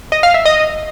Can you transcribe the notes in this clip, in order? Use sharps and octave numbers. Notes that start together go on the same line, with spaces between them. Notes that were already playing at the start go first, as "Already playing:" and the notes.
D#5
F5
E5
D#5